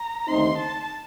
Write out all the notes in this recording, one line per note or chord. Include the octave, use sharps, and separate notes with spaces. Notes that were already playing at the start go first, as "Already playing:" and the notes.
Already playing: A#5
D#2 D3 A3 C4 D#4 C6
A5